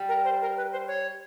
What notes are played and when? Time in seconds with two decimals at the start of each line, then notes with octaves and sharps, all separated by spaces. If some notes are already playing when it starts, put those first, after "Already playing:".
Already playing: G3
0.09 A#4
0.25 C5
0.41 A#4
0.57 B4
0.72 C5
0.88 C#5